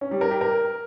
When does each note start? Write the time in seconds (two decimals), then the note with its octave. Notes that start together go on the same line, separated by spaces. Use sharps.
0.01 C#4
0.11 G3
0.21 A#4
0.31 G4
0.41 A#4